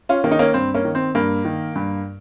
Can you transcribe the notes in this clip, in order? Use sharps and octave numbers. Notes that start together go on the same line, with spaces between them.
C#4 F4
D#3 A#3 C#4
D#4
A#3 C#4
G2 C4
A#3 C#4
D#3
C4
G2 A#3
D#3
G2